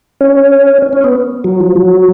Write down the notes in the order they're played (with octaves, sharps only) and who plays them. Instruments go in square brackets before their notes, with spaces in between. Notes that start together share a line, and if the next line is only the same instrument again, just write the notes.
[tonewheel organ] C#4
C#4
C#4
B3
F#3
F3
F#3